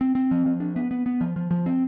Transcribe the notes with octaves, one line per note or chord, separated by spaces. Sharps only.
C4
C4
F3
F3
D4
B3
B3
B3
F3
F3
F3
C4